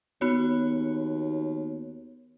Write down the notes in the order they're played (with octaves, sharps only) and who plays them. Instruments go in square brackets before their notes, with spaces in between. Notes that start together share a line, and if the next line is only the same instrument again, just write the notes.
[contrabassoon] D#2 [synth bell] B3 F#4 C#5